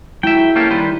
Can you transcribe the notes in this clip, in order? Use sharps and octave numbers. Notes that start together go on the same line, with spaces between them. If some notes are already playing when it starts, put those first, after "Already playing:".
F#3 G#3 E4 E5 G5
A#3 C#4 G4 A4
D#3 G3 B4 C5